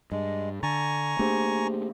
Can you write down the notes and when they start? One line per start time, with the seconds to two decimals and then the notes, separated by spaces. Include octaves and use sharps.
0.12 G2 G#3
0.63 D3 G#5 A#5 C#6 A6
1.19 A3 A#3 D4 G4 G#4 C5